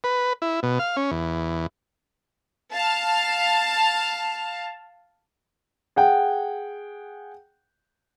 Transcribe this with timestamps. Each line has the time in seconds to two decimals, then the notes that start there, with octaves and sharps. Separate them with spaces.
0.04 B4
0.42 E4
0.63 B2
0.79 F5
0.96 C#4
1.11 E2
2.74 F5 A5
5.96 G#4 F#5 G5